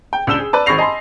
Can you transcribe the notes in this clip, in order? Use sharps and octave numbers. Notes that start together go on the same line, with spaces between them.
G5
C#2 D4 E6 E7 G7
G#4
B4 D5 A5
G#1 B5 C#6 A#6 C7 F7
D#5 G#5 A5 B5 C6